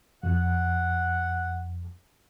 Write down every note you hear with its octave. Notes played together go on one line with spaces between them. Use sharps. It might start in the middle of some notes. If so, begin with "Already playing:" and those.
F2 F#5